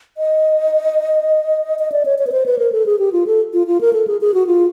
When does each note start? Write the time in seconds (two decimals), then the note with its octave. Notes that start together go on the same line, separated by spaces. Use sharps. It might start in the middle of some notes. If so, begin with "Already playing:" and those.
0.18 D#5
1.79 D#5
1.92 D5
2.05 C#5
2.19 C#5
2.27 B4
2.32 C5
2.46 B4
2.59 A#4
2.72 A4
2.86 G#4
2.99 G4
3.12 F4
3.27 A4
3.53 F4
3.67 F4
3.81 A#4
3.93 A4
4.08 G#4
4.21 G#4
4.34 F#4
4.47 F4